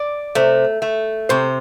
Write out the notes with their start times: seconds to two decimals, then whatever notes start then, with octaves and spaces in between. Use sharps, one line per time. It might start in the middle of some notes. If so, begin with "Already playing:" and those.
Already playing: D5
0.35 C3 A3
0.82 A3
1.29 C3 C5